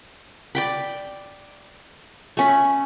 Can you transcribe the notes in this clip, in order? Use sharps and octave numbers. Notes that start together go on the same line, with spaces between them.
D5 G5 B5
A3 C#4 B5